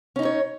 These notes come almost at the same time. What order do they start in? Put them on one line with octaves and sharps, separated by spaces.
C#4 D#4 E4 C#5